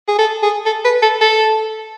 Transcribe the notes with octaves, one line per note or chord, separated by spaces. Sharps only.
G#4
A4
G#4
A4
B4
A4
A4